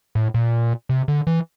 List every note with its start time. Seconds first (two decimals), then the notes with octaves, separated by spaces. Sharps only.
0.15 A2
0.34 A#2
0.89 C3
1.08 D3
1.27 E3